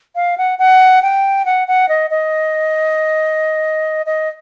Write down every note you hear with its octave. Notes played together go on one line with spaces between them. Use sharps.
F5
F#5
F#5
G5
F#5
F#5
D#5
D#5
D#5